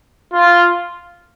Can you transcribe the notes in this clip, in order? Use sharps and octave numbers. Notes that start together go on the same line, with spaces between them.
F4